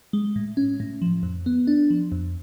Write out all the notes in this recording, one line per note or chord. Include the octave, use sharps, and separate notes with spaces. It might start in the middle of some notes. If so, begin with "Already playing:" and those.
G#3
A2
C#4
A2
F3
F2
B3
D4
F3
F2